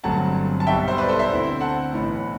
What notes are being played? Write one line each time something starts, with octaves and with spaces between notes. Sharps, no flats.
G1 G2 F#3 A3 C4 F#5 A5
A5
B1 B2 G3 E5 G5
C5 E5
B4 D5
A4 C5
C5 E5
D2 D3 A3 C4 E4
F#5 A5
B1 A2 E3 B3